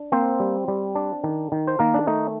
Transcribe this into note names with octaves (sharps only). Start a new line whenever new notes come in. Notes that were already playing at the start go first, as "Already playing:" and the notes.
Already playing: D4
A#3 C4 C5
G3
G3
D4
D#3
D#3
C5
D#3 A#3 A#4
D4
A3 D#4